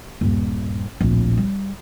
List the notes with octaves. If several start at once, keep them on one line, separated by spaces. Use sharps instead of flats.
D#1 G2
D1 A#1
G3